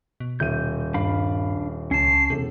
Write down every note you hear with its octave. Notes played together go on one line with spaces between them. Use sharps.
B2
D#1 E5 G6 D#7
G2 D4 F5 B5
C#2 C#4 A5 C7
E1 C3 A4